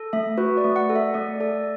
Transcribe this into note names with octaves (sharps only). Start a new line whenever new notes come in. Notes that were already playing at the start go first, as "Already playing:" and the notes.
Already playing: A4
A3 E5
F#4 B4
D5
A3
F#5
A4
E5
A3 D5
A4 D5